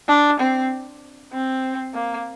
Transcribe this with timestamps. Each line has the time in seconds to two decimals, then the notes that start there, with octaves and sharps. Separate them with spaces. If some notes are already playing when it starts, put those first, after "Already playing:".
0.08 D4
0.40 C4
1.33 C4
1.94 A#3